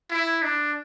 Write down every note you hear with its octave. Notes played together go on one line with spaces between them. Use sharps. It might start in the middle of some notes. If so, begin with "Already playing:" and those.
E4
D4